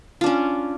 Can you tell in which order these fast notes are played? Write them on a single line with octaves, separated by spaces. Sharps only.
F4 D4 C#4